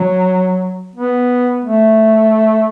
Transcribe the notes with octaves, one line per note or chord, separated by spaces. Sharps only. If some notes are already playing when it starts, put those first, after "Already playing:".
Already playing: F#3
B3
A3